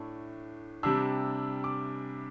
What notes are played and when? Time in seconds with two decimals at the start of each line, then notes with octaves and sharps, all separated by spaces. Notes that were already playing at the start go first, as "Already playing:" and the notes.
Already playing: A2 A3 D4
0.83 C3 G3 D4 E6
1.64 D6